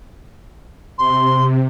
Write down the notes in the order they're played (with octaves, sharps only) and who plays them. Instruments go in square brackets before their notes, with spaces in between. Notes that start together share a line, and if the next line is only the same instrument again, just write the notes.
[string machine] C3 [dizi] C6